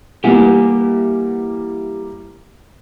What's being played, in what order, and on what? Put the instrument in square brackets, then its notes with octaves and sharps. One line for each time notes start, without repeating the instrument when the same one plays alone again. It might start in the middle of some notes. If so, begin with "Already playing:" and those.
[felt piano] E3 G3 A#3 [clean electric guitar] G4 F#5 G#5